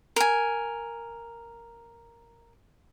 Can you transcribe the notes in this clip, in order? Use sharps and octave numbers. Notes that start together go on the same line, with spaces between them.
A#4 G#5